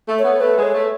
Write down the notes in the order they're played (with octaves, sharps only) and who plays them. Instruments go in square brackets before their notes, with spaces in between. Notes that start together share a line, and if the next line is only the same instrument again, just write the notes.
[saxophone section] A3
[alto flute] C#5
[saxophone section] B3
[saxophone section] A3 [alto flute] B4
[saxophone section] G#3
[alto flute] C#5
[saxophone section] A3